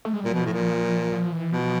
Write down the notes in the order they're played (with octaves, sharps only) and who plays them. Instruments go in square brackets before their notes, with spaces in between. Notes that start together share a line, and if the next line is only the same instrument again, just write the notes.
[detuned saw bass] A3
G#3
G3
[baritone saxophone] A#2 [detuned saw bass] F#3
[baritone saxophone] B2 [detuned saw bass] F3
[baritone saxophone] A2
A#2
[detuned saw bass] F3
E3
[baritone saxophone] B2 [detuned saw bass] F3